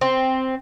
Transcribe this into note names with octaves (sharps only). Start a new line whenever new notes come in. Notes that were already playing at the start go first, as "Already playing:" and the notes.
C4